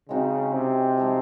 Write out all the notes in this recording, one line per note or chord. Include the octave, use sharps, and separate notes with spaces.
C#3 G#3 C4 D#4 F#4
C3
F3 G#3 D#4